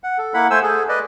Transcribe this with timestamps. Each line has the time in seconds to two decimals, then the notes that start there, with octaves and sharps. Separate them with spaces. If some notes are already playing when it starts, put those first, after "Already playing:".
0.04 F#5
0.18 A4
0.34 A#3 E4 F#5 B5
0.51 A3 C5 G#5 E6
0.63 G#4 A4
0.89 B4 D5 D#5